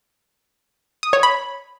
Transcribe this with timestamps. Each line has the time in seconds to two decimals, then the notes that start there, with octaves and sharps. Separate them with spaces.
1.03 D#6
1.13 C#5
1.23 B5